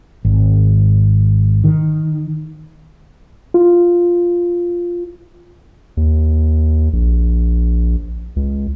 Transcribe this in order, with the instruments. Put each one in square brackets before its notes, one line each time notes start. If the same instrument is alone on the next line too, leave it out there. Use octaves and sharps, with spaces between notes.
[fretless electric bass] G#1
D#3
[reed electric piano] F4
[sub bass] D#2
A#1
C#2